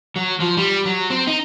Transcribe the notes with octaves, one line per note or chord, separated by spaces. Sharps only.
F#3
F3
G3
F#3
C4
D#4